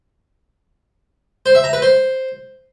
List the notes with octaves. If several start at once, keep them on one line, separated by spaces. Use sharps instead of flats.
C5
E5
A#5
B4
C5